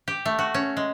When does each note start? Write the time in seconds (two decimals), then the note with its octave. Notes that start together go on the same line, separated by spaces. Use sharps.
0.08 G4
0.25 A3
0.39 F#4
0.54 C#4
0.77 G#3